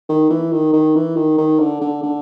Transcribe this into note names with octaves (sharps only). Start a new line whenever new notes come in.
D#3
E3
D#3
D#3
E3
D#3
D#3
D3
D3
D3